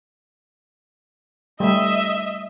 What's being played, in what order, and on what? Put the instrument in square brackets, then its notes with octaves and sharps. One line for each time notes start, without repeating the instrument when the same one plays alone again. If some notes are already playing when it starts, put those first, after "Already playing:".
[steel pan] G3 A3 [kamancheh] D#5 E5